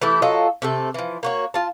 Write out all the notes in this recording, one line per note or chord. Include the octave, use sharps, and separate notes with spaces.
E3 A3 E4 G4
F#3 F4 A4 D#5
C3 A3 A4
E3 F3
A#3 F#4 C#5
F4 A5